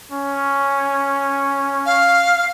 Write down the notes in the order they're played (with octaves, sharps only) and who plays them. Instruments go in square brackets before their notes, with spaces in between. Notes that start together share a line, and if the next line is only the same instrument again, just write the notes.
[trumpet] C#4
[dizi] F5